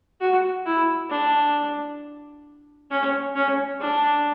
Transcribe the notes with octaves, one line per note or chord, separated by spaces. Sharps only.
F#4
E4
D4
C#4
C#4
D4